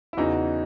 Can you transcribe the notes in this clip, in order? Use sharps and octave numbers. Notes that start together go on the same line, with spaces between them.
E4
E2 C#3 E3 D#4 F#4